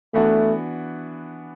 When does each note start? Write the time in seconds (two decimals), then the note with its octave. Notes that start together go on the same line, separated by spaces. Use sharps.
0.14 E3 A3 B3 D4 F#4